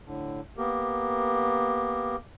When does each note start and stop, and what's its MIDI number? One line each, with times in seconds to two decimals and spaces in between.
0.05 0.41 45
0.05 0.41 50
0.58 2.16 58
0.58 2.16 59
0.58 2.16 67
0.58 2.16 70